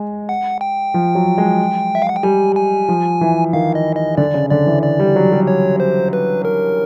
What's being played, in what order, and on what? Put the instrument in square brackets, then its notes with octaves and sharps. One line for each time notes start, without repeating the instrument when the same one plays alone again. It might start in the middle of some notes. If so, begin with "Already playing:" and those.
Already playing: [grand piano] G#3
[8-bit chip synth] F#5
G5
[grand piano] F3
F#3
G#3
[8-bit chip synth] E5
F5
F#5
G5
[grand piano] G3 [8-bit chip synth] G#5
[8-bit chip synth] G#5
[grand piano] F3
E3
[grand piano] D#3 [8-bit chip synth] F5
[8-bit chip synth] D#5
D#5
[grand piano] D3 [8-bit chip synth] D5
[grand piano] C#3
[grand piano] D3 [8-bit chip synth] D5
[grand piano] E3
[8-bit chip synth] D5
[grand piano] G3
F#3
G3
[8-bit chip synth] C#5
C5
B4
A#4